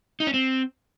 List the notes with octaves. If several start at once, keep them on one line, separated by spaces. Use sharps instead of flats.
D#4
C#4
C4